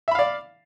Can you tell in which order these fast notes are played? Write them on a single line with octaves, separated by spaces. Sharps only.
E5 B5 F5 D5